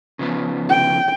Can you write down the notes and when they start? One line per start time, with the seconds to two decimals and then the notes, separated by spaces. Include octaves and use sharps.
0.19 C#3 F3 B3
0.69 G5